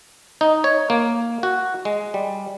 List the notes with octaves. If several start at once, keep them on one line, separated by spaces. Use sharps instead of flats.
D#4
C#5
A#3
F#4
G#3
G3